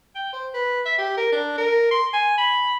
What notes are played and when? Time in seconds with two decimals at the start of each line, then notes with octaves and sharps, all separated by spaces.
0.15 G5
0.33 C5
0.54 B4
0.85 E5
0.98 G4
1.17 A#4
1.32 D4
1.58 A#4
1.91 C6
2.13 G#5
2.38 B5